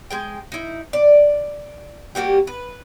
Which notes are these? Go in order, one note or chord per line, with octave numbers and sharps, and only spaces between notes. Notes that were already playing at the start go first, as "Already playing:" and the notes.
G#3 G#4 G5
D#4 E4
D5
G3 A#3 F#4 G4
B4